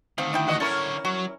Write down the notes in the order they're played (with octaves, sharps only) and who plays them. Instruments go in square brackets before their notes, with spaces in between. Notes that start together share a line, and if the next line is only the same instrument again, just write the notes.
[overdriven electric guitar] D2 D#3 [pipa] C4 F5
[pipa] D4 E4 G5
[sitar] E3 F#4 D#5
[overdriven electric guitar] D3 C#5 [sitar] C#4 E4 A#4 [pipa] A4
[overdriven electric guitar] F#3 [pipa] F#4